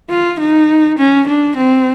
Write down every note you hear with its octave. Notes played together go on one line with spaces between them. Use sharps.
F4
D#4
C#4
D4
C4